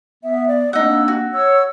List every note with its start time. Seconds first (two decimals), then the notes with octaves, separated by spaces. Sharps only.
0.24 B3 E5
0.48 D5
0.73 A#3 C4 D4 D#4 F#5 E6
1.08 F#4
1.34 C#5 E6